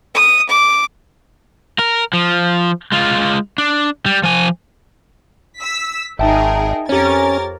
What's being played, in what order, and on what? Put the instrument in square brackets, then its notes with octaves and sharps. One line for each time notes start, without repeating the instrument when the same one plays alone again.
[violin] D#6
D6
[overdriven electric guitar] A#4
F3
G#3 F4
D4
G3
F3 G#5
[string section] E6 B6
[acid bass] G#1 [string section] D#4 G#4 A#4 [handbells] E5 G5 A5
[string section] F2 A#4 A6 [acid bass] C#4 [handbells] G4 C#5